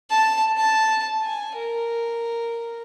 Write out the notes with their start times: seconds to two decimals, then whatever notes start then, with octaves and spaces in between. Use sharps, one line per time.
0.10 A5
0.58 A5
1.23 G#5
1.57 A#4